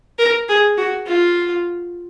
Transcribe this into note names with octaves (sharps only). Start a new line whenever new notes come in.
A#4
G#4
F#4
F4